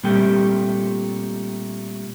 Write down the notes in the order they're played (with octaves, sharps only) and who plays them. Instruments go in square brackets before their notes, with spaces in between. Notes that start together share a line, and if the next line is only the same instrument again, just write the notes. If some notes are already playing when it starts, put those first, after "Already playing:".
[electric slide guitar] A#2 G3 A3 C4 G4 G5